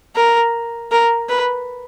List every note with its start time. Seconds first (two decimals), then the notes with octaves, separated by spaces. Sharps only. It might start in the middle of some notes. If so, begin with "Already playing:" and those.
0.16 A#4
0.92 A#4
1.29 B4